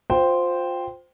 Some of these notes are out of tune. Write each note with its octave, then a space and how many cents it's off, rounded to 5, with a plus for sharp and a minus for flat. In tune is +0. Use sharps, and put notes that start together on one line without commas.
F4 +25 C5 -5 G5 +0